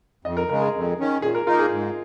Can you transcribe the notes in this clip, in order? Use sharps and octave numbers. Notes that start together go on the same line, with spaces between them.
F2 D#5
A#4
C#3 G#3 A#4
G#4
F2
D#3 C#4
A#2 G#4
A#4
A#3 D#4 F4 A#4
G#4
G#2